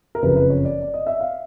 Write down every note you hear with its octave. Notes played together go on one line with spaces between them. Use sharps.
A#4
F#1 F2 C#3 B4
B4
C#5
D5
D5
D#5
E5
F5